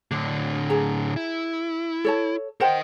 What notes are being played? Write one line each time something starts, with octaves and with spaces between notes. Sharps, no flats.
A2 D3 D4
G#4 A#5
E4
A4 C#5 A5
A#4 C5 D#5 F#5 G5